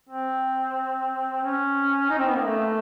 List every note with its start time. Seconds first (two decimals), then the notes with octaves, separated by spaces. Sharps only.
0.09 C4
1.43 C#4
2.10 D#4
2.18 C4
2.27 B3
2.35 A#3
2.43 A3